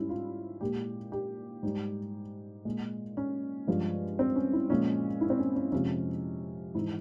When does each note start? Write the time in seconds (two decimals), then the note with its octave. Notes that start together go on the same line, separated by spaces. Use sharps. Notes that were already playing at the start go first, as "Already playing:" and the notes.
Already playing: G#2 G3 C#4 E4
0.09 F4
0.61 A#2 G#3 G4
1.12 G4
1.63 G#2 G3
2.65 A#2 G#3
3.17 C#4
3.67 G2 F3 G#3
4.19 C4
4.36 C#4
4.53 E4
4.70 A#2 F3 G#3 C#4
5.21 E4
5.30 C4
5.38 C#4
5.56 C#4
5.72 F2 C3 F3 G#3 C#4
6.75 G#2 E3 G#3 E4